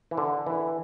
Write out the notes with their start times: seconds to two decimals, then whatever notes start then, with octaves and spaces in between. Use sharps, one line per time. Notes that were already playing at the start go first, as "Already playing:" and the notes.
0.11 E3
0.18 D3
0.47 E3